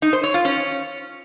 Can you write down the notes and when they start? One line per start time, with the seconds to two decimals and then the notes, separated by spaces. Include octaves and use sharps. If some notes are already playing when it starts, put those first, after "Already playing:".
0.02 D#4
0.13 C5
0.24 C#5
0.34 F4
0.45 C#4